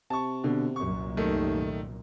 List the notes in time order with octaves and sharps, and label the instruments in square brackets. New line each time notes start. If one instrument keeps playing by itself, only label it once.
[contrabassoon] C3 [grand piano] A5 C#6
[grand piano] B2 D3
[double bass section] C2 F#2 A#2 [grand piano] C#6
[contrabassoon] D#2 [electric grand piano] D#3 A3